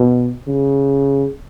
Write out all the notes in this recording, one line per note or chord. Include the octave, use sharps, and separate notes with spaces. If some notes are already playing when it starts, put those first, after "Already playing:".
Already playing: B2
C#3